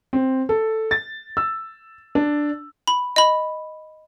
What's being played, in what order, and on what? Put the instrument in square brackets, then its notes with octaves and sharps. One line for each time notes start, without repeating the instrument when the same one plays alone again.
[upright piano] C4
A4
A6
E6
D4
[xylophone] B5
D#5 B5